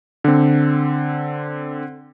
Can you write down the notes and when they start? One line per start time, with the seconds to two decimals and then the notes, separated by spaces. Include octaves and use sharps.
0.24 D3 C4